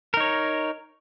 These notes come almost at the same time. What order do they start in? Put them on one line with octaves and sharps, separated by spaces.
A#4 D#4 C#5